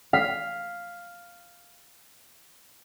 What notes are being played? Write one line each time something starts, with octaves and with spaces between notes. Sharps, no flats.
F5 B6